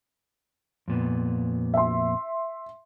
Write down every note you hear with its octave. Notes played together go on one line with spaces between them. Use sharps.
F2 A#2 B3
E5 C6